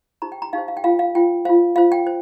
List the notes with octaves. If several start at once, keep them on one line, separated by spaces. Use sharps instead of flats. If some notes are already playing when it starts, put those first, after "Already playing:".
D#4 G4 C5 A#5
G5
A#5
D#4 G4 C5 F5
F5
G5
F4 C5 F5
F5
F4 C5 G5
F4 C5 F5
F4 C5 F5
G5
C5